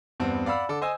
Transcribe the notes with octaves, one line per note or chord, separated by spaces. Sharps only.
E2 G2 B3 C4
D5 F5 F#5 B5 E6
D3 A4 D6
C5 D#5 G#5 E6